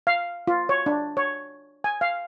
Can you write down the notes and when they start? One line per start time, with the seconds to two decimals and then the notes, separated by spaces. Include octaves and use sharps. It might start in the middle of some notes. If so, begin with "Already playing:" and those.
0.07 F5
0.47 F4
0.69 C#5
0.86 D4
1.17 C#5
1.84 G#5
2.01 F5